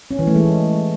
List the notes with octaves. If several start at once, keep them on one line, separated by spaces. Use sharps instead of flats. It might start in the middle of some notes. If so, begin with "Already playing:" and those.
C#4
E3
A3
G#3